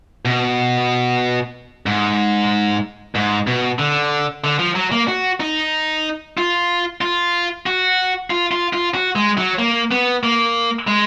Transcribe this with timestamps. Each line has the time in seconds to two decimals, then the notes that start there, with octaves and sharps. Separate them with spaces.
0.25 B2
1.86 G#2
3.15 G#2
3.47 B2
3.79 D3
4.44 D3
4.59 F3
4.75 F#3
4.92 A#3
5.08 F#4
5.40 D#4
6.37 F4
7.01 F4
7.66 F#4
8.30 F4
8.52 F4
8.73 F4
8.94 F#4
9.16 G#3
9.37 F#3
9.59 A#3
9.91 B3
10.23 A#3
10.87 G#3